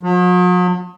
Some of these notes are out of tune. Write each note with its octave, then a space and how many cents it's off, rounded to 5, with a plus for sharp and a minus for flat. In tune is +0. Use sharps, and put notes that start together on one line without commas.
F#3 -45